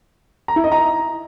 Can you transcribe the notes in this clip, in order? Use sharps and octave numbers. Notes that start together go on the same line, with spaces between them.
A#5
E4
D#5
A#5